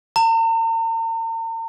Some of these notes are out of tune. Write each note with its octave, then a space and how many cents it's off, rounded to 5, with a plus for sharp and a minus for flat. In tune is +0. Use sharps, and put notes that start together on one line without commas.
A#5 -45